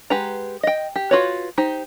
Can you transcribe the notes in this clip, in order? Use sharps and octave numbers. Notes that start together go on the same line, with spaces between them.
G#3 G4 B4 F#5 A#5
D#5 G5
G4
F4 F#4 B4 C#5
D#4 G4 C5